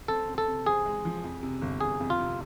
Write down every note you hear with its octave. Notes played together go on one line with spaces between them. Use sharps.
C4 A4
C4
A4
C3
C4 G#4
G#3
F3
F2
C3
G1
G1 G#4
F2
F4
C3